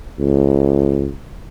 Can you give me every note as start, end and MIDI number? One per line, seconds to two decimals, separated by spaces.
0.19 1.11 37